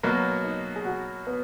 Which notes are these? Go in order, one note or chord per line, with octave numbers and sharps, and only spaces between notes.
B2 F#3 A#3 B3
D#4
G#4
F#4
B3